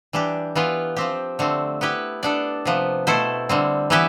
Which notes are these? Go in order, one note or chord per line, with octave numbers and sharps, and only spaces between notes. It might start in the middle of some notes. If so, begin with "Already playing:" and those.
E3 G3 D4 G4
E3 B3 F4 B4
F3 C4 G4
D3 A3 C4
B3 E4 G4 B4
B3 D4 A4 D5
C3 F3 B3
B2 A3 E4 A4 C5
D3 G3 C4
E3 B3 E4 G4 B4